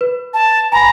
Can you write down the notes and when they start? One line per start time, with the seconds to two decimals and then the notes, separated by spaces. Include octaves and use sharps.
0.01 B4
0.34 A5
0.72 G#5 A#5 B5